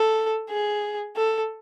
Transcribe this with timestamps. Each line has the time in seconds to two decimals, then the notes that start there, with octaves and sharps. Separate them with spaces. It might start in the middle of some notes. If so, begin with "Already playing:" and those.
Already playing: A4
0.50 G#4
1.16 A4